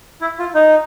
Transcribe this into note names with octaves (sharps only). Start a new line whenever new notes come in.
E4
F4
D#4